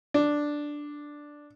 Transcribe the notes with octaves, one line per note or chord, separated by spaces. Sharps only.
D4